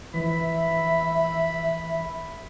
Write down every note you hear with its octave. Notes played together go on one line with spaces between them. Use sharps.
E3 F3 E5 B5